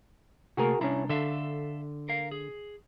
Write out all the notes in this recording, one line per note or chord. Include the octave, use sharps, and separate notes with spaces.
C3 A3 A#3 F#4 G#4 A#4
C2 C#4 D4 E4 A#5
D3 A4 E5 F5
A#4 F5
G#4